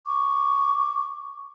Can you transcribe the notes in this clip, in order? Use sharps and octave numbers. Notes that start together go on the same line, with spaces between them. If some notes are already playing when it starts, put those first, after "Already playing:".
C#6 D6